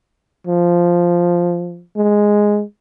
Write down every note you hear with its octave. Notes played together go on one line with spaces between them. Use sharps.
F3
G#3